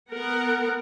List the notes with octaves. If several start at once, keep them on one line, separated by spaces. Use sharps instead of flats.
B3 A#4 F#5